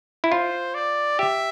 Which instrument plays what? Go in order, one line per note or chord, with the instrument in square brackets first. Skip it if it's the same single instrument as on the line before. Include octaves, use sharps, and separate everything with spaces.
[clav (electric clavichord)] E4
[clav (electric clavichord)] F4 [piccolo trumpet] C5
[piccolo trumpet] D5
[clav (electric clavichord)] G4 [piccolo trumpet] E5